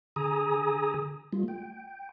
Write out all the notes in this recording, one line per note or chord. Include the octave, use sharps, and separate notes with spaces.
D3 G#4 G#5 A#5 D#6
G3 A3 F4
G5